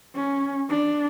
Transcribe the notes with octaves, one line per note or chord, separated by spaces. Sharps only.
C#4
D4